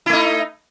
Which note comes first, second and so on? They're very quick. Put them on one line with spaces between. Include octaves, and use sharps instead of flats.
E4 A3 D#4